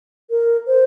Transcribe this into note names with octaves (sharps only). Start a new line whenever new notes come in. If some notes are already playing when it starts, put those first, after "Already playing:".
A#4
C5